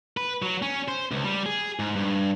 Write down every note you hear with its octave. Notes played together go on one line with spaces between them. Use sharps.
B4
F#3
C#4
C5
C#2
G3
G#4
G#2
G2